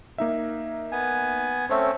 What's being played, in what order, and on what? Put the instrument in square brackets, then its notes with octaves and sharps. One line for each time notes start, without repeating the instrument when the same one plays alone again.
[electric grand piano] A#3 D#4 E5
[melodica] B3 G#5
[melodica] A3 C4 C#4 [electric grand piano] C5 E5